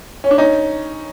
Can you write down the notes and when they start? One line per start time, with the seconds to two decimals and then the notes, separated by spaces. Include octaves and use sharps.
0.24 C#4
0.31 D4
0.38 C#4 D#4